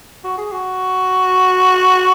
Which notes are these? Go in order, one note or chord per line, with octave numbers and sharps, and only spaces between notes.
F#4
G#4
F#4